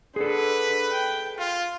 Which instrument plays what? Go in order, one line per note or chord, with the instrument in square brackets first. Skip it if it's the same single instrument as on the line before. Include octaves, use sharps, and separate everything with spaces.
[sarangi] D3 [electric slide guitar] G#4 A4 [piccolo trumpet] B4
[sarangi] G5
[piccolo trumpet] F4 [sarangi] F5